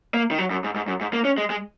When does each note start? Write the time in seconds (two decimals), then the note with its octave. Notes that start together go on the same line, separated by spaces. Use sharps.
0.14 A#3
0.31 D#3
0.38 F#3
0.51 F#2
0.64 G#2
0.75 G#2
0.88 F#2
1.01 G#2
1.13 A#3
1.25 C#4
1.38 G#3
1.50 G#3